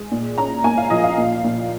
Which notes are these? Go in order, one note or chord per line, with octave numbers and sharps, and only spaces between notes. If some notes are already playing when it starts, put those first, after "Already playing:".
Already playing: G#3
A#2
C#4 A#5
A#3 G#5
F5
F3 D#5
F5
A#2
A#2